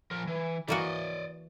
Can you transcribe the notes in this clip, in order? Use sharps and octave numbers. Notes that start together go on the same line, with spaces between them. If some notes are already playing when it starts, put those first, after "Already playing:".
F3 A#4
E3
E3 A#3 F#4 D5 D#5